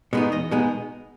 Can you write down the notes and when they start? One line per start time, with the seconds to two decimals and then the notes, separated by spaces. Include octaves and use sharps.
0.13 B2 G#3 B3 D#4
0.32 E2 D#5
0.51 B2 G#3 B3 D#4